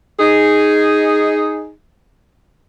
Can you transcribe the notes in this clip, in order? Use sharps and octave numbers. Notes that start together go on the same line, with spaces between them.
D#4 G#4